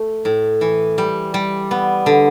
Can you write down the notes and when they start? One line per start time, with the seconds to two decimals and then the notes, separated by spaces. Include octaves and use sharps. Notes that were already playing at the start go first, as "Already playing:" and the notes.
Already playing: A3
0.25 A2
0.61 E3
0.98 G3
1.34 G3
1.71 B3
2.06 D3